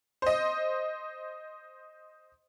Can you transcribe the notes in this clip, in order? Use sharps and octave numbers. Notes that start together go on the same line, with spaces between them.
C5 D#5